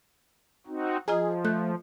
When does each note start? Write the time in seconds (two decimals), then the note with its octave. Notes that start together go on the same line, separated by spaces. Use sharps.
0.67 C4 D#4 F#4
1.08 F3 F4 G#4 D#5 A#5
1.45 A3 F#6 G6